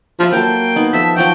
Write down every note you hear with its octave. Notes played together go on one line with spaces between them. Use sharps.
F3 E5 F5 B5
F#3 A#3 A4 G5
B3 D#4
F3 A4 E5
F3 F#3 F#4 G5